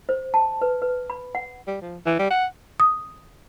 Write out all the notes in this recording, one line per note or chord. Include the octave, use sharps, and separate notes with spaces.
C5
A5
B4
B4
B5
F#5
G3
F3
E3
G3
F#5
D#6